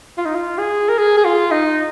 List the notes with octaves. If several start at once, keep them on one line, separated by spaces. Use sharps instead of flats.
F4
D#4
F4
G#4
A#4
G#4
G#4
F4
D#4